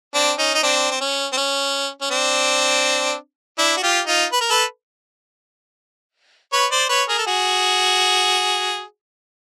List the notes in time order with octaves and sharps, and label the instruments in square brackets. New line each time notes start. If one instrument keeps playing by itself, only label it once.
[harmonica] C4 D4
C#4 D#4
D#4
C4 D4
C4
C#4
C4
C#4
C#4
C4 D4
D4 E4
F#4
F4 G4
D#4 F4
B4
A#4
A4 B4
B4 C#5
C5 D5
B4 C#5
G#4 A#4
A4
F#4 G#4